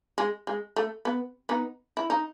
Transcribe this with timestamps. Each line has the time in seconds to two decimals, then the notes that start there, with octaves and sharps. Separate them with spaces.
0.18 G#3
0.47 G#3
0.76 A3
1.05 B3
1.49 B3 D#4
1.97 E4
2.10 D#4